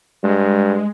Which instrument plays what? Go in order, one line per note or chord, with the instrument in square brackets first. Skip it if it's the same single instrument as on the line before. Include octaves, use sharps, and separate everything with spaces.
[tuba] G2 [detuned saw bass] G#3